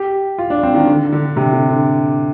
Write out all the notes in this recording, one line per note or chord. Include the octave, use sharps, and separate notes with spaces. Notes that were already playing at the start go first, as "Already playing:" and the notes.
Already playing: G4
F4
D4
C4
D#3
D3
D3
C3
D3
D3